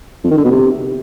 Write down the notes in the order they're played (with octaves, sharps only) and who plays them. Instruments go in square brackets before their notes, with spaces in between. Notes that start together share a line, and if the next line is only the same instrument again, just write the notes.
[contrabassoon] F2
D#3
D3
B2
C3